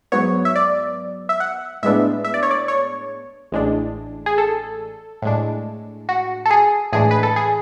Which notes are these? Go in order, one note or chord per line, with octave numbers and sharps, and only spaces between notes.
G#2 F#3 B3 C#5
E5
D5
E5
F#5
A2 G#3 B3 D4 E5
E5
D5
C#5
D5
C#5
A1 A2 G#3 D4
G#4
A4
A2 G#3 D4
F#4
A4
G#4
A2 E3 G#3 D4 G#4
B4
A4
G#4